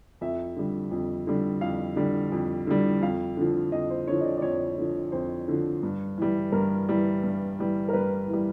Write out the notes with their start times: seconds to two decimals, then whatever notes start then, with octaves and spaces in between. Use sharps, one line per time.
0.21 F2 E5
0.56 D3 G3
0.91 F2
1.27 D3 G3
1.61 F2 F5
1.96 D3 G3
2.32 F2
2.67 D3 G3
3.01 F2 F5
3.37 D3 F3
3.72 F2 D#5
3.90 C5
4.07 D3 C#5
4.12 F3
4.21 D#5
4.24 D5
4.38 D5
4.42 F2 C#5
4.78 D3 F3
5.12 F2 C5
5.48 D3 F3
5.83 G2
6.18 E3 G3
6.52 G2 A#4
6.89 E3 G3
7.23 G2
7.59 E3 G3
7.89 A#4
7.93 G2 B4
8.28 E3
8.33 G3